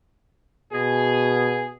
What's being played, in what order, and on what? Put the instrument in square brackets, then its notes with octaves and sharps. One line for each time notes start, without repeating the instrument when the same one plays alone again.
[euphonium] B2 [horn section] G#4